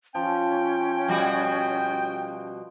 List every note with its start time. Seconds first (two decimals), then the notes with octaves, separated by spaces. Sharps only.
0.15 F3 C#4 G5
1.08 B2 G3 F#4